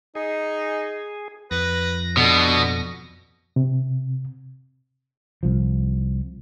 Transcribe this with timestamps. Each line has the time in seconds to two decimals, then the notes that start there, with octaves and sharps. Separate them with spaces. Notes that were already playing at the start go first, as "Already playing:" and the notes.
0.15 D#4 G#4
1.51 F2 B4 A#6
2.17 B2 D3
3.56 C3
5.43 C2 F3